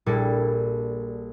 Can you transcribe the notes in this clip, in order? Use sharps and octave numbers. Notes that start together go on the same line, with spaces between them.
A#1 A#2 G3 E4 A4 A5